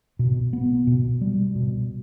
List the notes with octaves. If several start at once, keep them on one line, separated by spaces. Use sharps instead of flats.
B2
B3
B2
G3
B2